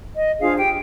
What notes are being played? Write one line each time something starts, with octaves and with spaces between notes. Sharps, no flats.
D#5
D4 F4 G#4 C5 F5
G4 G5